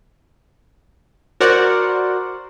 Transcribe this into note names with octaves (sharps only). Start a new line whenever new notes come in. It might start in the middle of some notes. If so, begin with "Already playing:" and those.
F#4 A#4 C5 D5 F#5